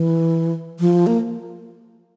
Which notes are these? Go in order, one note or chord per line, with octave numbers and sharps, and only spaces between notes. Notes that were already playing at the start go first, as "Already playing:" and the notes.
Already playing: E3
F3
A#3